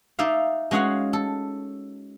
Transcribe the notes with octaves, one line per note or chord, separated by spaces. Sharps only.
D#4 D5 E5 F5
G#3 C#4 F#4 G#4 F5 F#5
A4